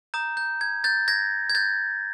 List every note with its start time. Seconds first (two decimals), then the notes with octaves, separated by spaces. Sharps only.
0.14 A#5 D#6 G6
0.37 G6
0.61 G#6
0.84 G6 A6
1.08 G#6 A#6
1.50 G#6
1.55 G6 A6